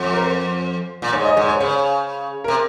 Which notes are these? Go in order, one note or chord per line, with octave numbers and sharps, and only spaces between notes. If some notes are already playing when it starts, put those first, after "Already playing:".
Already playing: F2
A#4
C5
A#2
G#2 C#5
D#5
G#2 C#5
C#5
C#3 C#5
C3 A#4